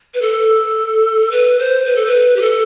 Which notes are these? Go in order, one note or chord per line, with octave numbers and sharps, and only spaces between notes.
B4
A4
B4
C5
B4
A4
B4
G4
A4